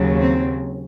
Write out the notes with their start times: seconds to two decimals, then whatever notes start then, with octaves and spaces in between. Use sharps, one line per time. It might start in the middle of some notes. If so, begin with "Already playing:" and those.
Already playing: D#2 C#3 F#3
0.20 C4